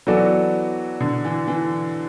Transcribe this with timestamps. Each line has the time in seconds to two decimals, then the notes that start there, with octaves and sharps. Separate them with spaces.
0.07 E3 F#3 B3 F#4 A4 D5
1.01 D3
1.25 E3
1.48 E3